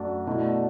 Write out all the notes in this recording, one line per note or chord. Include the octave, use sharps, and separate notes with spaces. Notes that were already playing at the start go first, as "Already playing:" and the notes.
Already playing: F#2 A3 D4 F#4
B2 A3 E4